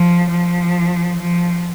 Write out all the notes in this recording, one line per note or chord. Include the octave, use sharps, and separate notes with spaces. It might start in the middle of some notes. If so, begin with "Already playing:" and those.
Already playing: F3
F3
F3